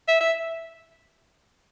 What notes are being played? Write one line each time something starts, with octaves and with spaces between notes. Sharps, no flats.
E5
E5